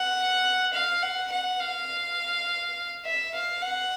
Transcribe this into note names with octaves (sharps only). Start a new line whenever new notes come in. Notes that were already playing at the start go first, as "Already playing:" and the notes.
Already playing: F#5
F5
F#5
F#5
F5
E5
F5
F#5